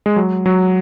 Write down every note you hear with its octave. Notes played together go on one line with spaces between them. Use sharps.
G#3
F#3
F#3